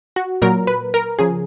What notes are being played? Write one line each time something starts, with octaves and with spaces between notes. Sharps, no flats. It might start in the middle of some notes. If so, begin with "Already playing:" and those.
F#4
A#2 F#3 A#4
B4
A#4
C#3 F3 G#4